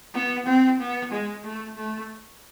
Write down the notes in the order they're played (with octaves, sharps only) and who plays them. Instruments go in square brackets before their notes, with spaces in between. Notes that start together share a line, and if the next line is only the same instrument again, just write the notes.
[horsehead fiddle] B3
C4
B3
G#3
A3
A3